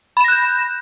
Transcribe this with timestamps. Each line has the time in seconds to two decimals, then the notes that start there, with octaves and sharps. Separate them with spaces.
0.17 B5
0.21 E7
0.24 A#6
0.28 F#6
0.32 G6